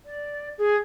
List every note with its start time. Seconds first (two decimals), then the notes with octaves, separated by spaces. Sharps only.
0.05 D5
0.58 G#4